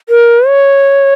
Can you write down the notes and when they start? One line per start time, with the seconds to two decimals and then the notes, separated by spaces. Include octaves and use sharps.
0.09 A#4
0.47 C#5